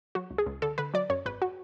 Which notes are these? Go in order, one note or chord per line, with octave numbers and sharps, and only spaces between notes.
F#3 F#4
C#2
G#4
C#2
D3 A4
D3 B4
F#3 D5
F#2 C#5
G#1 B4
F#4